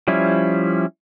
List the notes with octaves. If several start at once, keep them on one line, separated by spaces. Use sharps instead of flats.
F3 G3 C#4 E4